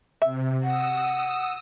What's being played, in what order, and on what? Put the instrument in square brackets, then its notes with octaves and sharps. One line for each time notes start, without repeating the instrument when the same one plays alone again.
[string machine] C3 [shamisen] E5
[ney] F#5 [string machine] D#6 E6